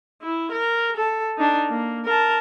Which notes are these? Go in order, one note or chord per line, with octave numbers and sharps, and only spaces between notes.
E4
A#4
A4
D4 D#4
A#3
A#4 A5